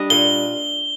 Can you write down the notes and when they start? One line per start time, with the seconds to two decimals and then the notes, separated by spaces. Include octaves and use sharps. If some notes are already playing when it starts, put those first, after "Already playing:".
Already playing: G3 D4 D#5
0.10 A#2 G7